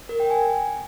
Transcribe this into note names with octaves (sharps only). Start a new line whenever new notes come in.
A#4
G5
G#5